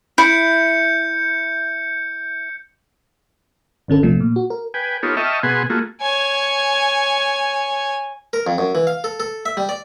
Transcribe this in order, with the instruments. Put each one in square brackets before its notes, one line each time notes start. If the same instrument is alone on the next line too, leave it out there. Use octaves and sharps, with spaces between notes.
[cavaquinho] E4 [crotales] G6 C#7
[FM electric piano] G1 D3 C#4 A4
A#1 C3 F3 A3
A#2
F#4
A#4
[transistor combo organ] B4 G5 G#5
B3 D#4 F4 G4 A4 C#5
D#5 E5 G5 A5 C#6 F6
B2 B3 G#4 F#5 G#5 C6
A3 A#3 F4 F#4 G#4
[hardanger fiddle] C#5 G#5
[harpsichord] A#4
F2
F#2
E3
F5
A4
A4
E5
G3
D5